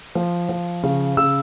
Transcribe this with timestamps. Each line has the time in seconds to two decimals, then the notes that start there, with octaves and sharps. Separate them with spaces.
0.15 F3
0.49 F3
0.83 C#3
1.17 C#3 E6